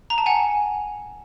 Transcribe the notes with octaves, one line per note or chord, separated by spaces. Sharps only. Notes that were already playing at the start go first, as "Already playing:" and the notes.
A#5
A5
F#5 G#5